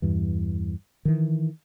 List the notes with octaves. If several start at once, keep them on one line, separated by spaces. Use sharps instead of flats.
E2 G2 E3
D#3 E3